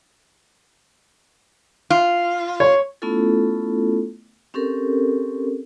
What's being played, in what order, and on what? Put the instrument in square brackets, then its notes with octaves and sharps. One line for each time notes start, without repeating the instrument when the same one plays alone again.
[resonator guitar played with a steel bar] F4
[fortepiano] C#5
[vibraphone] A3 B3 C#4 E4 F4 A4
C4 C#4 G4 A4 A#4